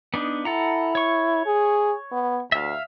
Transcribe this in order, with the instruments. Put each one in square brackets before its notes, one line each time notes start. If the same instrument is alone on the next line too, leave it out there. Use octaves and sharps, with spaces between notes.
[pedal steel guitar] B3 D4 D#4
[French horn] E4 [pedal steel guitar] A4 F#5 A#5
[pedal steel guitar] C#5 C#6
[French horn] G#4
B3
[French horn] D2 [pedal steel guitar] E5 F5